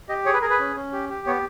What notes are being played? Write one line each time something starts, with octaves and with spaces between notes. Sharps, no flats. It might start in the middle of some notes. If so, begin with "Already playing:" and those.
G4 D#5
G#4 C#5
B4
G#4 A#4
B4
C#4
C#4
G4
G4
B3 C#5